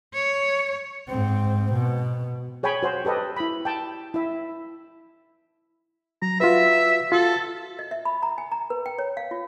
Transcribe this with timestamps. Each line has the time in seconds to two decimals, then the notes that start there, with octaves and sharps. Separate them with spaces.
0.14 C#5
1.08 G#2 C4
1.73 B2
2.63 G#4 C#5 G5 G#5 B5
2.83 F#4 C5 G#5
3.05 G4 A4 B4 D#5
3.37 E4 B5
3.65 G5 A5
4.14 E4 E5
6.22 F#3 A#5
6.40 F4 F#4 B4 E5
7.12 F4 F#4 A4
7.79 D#5
7.91 E5
8.05 B5
8.23 A#5
8.38 G#5
8.52 A#5
8.70 B4
8.86 G5
8.99 C#5
9.17 F5
9.31 F4